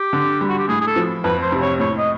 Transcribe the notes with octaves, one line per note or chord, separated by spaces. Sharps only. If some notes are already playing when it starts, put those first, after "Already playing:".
Already playing: G4
D3
G3
F#4
G4
A2 G#4
G#4
A4
F3
F2 B4
C5
C3
C#5
A2 C#5
D#5